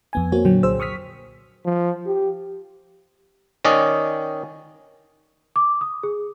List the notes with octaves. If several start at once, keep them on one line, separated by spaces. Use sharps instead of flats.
F2 B3 G#5
A#3 C4 F#4 C#5
A#2 D3 F#3 G5
C2 G#4 C5 E6
C#6 D#6 F6 B6
F3
G4
D#3 C#4 D5 D#5
D6
D#6
G#4